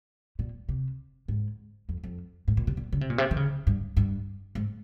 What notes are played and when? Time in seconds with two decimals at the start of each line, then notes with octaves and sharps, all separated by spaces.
0.39 A#2
0.69 C3
1.28 G#2
1.89 F2
2.04 F2
2.48 G#2
2.57 A#2
2.67 C3
2.77 A#2
2.92 C#3
3.01 C3
3.10 A#2
3.18 C3
3.31 D#3
3.37 C#3
3.67 G2
3.97 G2
4.55 G#2